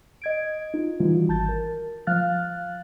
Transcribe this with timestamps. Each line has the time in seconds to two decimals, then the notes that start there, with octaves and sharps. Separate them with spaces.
0.22 D#5 G#6 D7
0.74 D#4 F4
0.99 D#3 E3 G3 D#4 F4 F#4
1.29 G#1 A5 G6 A6
1.49 A#4
2.07 F3 F5 F6 F#6 A6